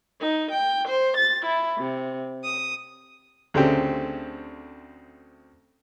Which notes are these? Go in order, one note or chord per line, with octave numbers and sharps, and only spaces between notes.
D#4
G5
C5
A6
E4
C3
D#6
D2 C#3 A3 C4 G4